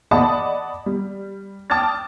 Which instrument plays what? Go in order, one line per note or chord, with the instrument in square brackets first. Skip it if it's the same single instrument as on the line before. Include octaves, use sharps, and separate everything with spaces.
[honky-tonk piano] D5 D#5 F#5 A5 B5 D#6
G3
G5 A5 D6 D#6 F6 A6